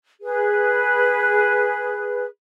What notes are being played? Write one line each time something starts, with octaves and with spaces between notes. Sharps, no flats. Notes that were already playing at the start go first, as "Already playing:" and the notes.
G#4 B4